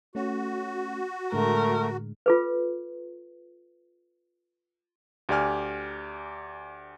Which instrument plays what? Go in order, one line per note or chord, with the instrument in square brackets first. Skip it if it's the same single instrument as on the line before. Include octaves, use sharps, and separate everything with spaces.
[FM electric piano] A3 C#4 [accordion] F#4
[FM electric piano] A2 D3 G#3 [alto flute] A3 [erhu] A#4
[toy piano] F4 A4 B4
[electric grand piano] D2 G4 D5 G#5 F6